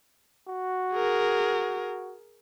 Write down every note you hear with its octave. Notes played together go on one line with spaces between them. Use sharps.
F#4
G#4 A#4